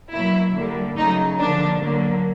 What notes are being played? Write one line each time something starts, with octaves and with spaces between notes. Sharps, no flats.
B2 F#3 A#3 E4
D3 G3 A#3
C#3 F#3 A3 D#4
D3 F3 A#3 D4
D3 F#3 A#3